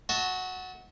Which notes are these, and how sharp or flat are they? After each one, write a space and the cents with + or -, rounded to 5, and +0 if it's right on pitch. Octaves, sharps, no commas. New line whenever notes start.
F#4 +0 E5 -40 A5 +0